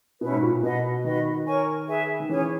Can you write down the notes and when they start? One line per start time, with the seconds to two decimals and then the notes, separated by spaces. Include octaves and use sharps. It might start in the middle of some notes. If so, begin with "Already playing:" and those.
0.21 B2 C#4 E4 B4
0.32 G#2
0.42 A#2
0.53 A#2
0.63 B2 B4 D#5 F#5
1.04 D#3 F#4 B4 D#5
1.46 A#4 C#5 G#5 C#6
1.88 G#4 B4 E5 G#5
2.20 D#3
2.29 E3 C#4 G#4 C#5 G#5